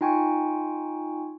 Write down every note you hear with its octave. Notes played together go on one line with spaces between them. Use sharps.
D#4 F4 G5 G#5 C#6